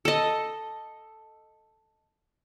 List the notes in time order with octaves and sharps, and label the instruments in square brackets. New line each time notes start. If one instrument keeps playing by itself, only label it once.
[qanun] A4 D#5